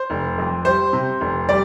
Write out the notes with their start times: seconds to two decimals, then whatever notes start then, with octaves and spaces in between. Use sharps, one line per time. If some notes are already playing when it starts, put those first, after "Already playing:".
Already playing: C5
0.10 F1
0.38 F2
0.65 G3 C5
0.93 C3
1.21 F1
1.49 G3 D5